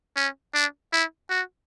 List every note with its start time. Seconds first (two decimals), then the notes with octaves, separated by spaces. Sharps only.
0.16 C#4
0.54 D4
0.93 E4
1.30 F#4